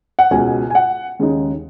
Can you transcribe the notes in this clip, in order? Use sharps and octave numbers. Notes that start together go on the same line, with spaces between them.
F#5
C#2 B2 G#3 G#5
G#5
F#5
D#2 C#3 G#3 D#4